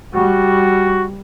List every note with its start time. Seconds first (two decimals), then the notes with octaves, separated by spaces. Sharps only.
0.13 G3 F#4